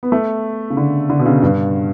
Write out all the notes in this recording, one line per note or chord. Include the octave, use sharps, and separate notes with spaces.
B3
A3
C#3
D3
D3
B2
C#3
G2